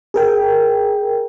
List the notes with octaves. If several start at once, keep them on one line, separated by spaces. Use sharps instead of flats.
G#4 A#4 G5